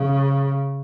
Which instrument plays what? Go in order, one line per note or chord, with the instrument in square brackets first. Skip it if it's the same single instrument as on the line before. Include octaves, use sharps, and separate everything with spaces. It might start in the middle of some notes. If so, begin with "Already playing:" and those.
Already playing: [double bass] C#3